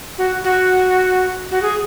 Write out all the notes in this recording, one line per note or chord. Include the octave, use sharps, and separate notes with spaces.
F#4
F#4
F#4
G#4